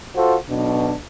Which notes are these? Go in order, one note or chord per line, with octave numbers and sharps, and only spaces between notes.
F4 F#4 A4 C5
B1 B2 D4